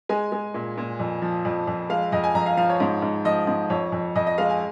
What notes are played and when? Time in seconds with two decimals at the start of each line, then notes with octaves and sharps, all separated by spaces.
0.09 G#3 G#5
0.32 G#3
0.54 A#2
0.77 A#2
1.00 F2
1.22 F3
1.45 F2
1.67 F2
1.90 G#3 F5
2.12 F2 D#5
2.24 G#5
2.35 F2 A#5
2.46 F5
2.57 F3 F5
2.69 C#5
2.80 G#2
3.02 G#2
3.25 F3 D#5
3.47 G#2
3.70 F2 C#5
3.92 F2
4.15 F2 D#5
4.27 D#5
4.38 G#3 F5
4.49 G#5